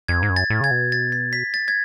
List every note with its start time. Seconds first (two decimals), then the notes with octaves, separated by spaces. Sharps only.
0.08 F2 G#6
0.22 G#2
0.29 F#2
0.36 A6
0.50 A2
0.61 C#3 G#6
0.71 B2
0.92 A6
1.12 A6
1.33 B6
1.54 A6
1.68 G#6